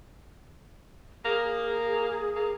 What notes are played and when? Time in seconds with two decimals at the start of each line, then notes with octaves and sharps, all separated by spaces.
1.25 A#3 G#4
2.36 A#3